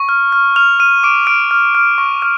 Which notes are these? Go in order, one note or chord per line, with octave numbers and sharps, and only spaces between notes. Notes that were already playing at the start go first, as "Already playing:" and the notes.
Already playing: C#6
F6
F6
F6 F7
F6 D#7
D6 D7
F6 D7
F6
F6
C#6
F6